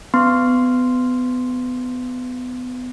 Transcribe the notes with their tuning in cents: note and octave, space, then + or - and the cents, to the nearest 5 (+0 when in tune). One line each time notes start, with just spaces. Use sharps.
B3 +25 C6 +0